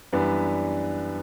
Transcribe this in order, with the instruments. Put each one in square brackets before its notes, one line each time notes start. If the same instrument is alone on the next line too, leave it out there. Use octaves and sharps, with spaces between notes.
[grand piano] F#2 E3 G3 B3 D4